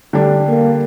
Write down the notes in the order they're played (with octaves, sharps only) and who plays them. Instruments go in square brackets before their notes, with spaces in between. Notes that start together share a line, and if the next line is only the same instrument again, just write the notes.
[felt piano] D3 G3 D4
[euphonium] A#3